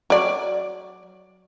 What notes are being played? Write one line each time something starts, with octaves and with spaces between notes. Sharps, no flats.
F#3 D5